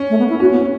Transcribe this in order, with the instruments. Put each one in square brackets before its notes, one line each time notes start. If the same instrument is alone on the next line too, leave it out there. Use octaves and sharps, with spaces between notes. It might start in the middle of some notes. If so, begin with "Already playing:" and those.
Already playing: [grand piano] C#4
[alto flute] A3
B3
E4
[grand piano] C#4 [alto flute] F#4
[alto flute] B3
C#4